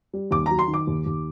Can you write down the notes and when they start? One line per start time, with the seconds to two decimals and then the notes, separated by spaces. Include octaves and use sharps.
0.13 G3
0.31 D#2 D6
0.46 F#3 A#5
0.59 C6
0.68 D#3
0.74 D6
0.87 D#2
1.06 D#2